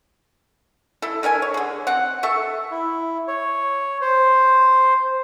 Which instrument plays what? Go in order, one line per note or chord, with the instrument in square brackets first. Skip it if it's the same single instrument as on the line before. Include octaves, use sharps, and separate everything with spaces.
[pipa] E4 A4
A4 A#4 D#5 G#5
C#5
D3 G#4
C4 F#5
A4 E5 C#6
[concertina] E4
C#5
C5